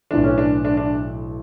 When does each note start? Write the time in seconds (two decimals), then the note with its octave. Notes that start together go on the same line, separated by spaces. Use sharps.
0.11 B1 A2 E3 D4
0.24 C#4
0.38 D4
0.65 D4
0.77 D4